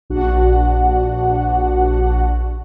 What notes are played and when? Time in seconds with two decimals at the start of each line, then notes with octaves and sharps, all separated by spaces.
0.10 A#1 D4 F#4 F#5